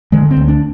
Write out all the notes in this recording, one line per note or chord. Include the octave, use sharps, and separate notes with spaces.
D3 G#3
C4
D2
D4